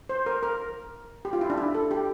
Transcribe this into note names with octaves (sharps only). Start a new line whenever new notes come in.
C5
A#4
A#4
G4
F4
E4
D4
E4
A4
G4